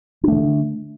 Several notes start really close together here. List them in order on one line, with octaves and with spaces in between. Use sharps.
D4 A3 D#3 D3